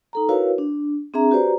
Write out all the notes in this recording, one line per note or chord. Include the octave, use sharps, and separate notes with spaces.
D#4 A4 A#5
E4 F#4 A#4 B4 C#5 F5
D4
C4 D4 G#4 E5 A#5
F#4 G4 B4 C5 D5 A#5